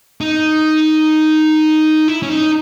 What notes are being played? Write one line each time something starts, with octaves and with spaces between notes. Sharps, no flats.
D#4
E4
C#4
D#4